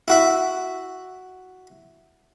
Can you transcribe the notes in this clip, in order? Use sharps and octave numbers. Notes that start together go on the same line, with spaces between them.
E4 F#4 E5